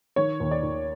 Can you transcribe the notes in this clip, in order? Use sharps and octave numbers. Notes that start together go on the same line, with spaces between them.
D#3 C#5
D#2
D5
D#2